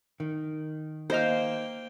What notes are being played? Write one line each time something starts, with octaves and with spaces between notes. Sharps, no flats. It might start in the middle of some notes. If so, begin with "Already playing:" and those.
D#3
A#3 D#4 C5 D#5 F5 G5